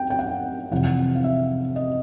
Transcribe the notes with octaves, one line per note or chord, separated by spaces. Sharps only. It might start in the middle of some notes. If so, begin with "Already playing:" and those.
Already playing: G5
G5
F#5
F2 C3 E3 F#5
F5
E5
D#5